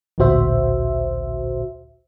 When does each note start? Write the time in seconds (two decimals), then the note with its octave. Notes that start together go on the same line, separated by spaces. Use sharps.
0.18 A1 D2 A#2 F#4 C5 E5